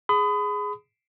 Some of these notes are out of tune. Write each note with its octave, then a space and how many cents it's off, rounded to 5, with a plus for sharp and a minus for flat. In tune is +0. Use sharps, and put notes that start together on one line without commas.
G#4 +0 B5 +35 D#6 +0